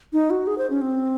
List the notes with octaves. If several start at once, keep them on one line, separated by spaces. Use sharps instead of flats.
D#4
F#4
G#4
C5
C#4
C4